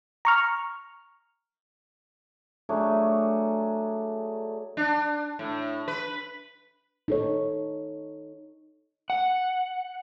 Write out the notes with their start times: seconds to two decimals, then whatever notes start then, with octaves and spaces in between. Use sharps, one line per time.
0.25 A#5 C#6 F6
2.69 F#3 A3 D4 G#4
4.77 D4
5.39 A2
5.88 B4
7.08 D#4 A4 C#5
9.10 F#5